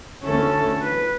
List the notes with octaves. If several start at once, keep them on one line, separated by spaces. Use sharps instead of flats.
D2 D3 A3 C#4 A4
B4